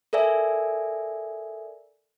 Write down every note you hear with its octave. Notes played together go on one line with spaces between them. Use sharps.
A4 A#4 D5 E5 G#5